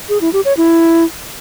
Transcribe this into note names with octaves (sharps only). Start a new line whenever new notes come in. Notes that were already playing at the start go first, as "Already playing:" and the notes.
G#4
E4
G4
C#5
E4